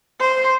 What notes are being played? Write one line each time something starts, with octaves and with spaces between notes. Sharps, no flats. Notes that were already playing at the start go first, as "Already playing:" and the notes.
C5